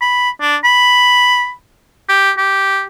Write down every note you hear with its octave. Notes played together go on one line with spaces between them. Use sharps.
B5
D4
B5
G4
G4